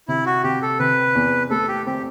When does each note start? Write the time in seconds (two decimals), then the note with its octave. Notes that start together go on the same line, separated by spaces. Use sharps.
0.08 C3 E4
0.26 F#4
0.44 C3 G4
0.62 A4
0.79 C3 B4
1.15 E2
1.50 A3 A4
1.68 G4
1.86 C4 G4